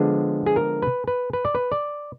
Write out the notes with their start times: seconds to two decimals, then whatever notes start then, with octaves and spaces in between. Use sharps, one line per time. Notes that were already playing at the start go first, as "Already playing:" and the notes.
Already playing: D3 F3 G#3 B3 D4 G#4
0.46 G#4
0.56 A#4
0.82 B4
1.08 B4
1.33 B4
1.45 D5
1.55 B4
1.72 D5